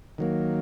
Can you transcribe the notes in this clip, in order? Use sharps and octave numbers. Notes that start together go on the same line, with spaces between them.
D#3 F#3 A#3